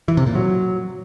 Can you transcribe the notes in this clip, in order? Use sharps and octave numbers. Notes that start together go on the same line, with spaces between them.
E3
C3
A#2
F#3